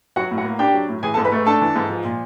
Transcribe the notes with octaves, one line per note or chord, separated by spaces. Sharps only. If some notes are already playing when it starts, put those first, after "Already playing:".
F#3 F#4 F#5
A2
F#4 F#5
A#3
D4 G4 G5
F#3
A2
E3 G#4 G#5
A4 A5
G#2
B4 B5
A3
D4 A4 A5
E3
G#2
F3
A#2